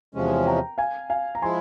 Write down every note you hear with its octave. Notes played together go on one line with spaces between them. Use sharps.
E2 C3 F3 G#3 C#4
G5 A#5
F5 G#5
F5 G#5
A#5
F3 G#3 E4 G#5 C6